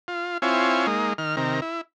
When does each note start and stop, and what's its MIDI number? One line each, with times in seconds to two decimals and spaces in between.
0.08 0.38 65
0.42 0.87 60
0.42 0.87 64
0.42 0.87 65
0.42 0.87 73
0.42 0.87 80
0.87 1.13 56
0.87 1.13 58
0.87 1.13 63
1.18 1.36 51
1.18 1.36 89
1.37 1.60 48
1.37 1.60 51
1.37 1.60 70
1.62 1.81 64